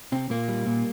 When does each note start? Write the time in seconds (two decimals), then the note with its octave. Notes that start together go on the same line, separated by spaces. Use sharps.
0.12 C3 C4
0.30 A#2 A#3
0.48 G3
0.67 A#2